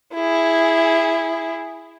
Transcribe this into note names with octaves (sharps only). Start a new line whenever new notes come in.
E4 G#4